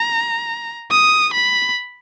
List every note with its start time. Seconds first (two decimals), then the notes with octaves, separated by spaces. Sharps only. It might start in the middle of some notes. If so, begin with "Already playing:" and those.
Already playing: A#5
0.91 D#6
1.33 B5